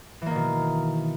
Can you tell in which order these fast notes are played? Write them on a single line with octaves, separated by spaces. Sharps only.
E3 A#3 D#3 B2